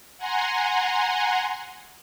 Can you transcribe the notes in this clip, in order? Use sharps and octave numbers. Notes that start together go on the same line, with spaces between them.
F#5 G#5 A#5 C6